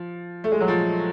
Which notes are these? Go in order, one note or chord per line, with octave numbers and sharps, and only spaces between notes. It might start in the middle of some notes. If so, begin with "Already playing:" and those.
Already playing: F3
A3
G#3
F#3
F3